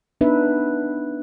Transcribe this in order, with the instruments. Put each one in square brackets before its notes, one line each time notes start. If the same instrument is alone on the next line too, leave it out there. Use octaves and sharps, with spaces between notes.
[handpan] B3 D4 D#4 B4 E5